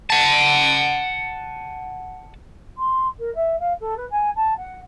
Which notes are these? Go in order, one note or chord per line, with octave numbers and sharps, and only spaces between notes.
F#5 A5
C6
A#4
E5
F5
A4
B4
G#5
A5
F#5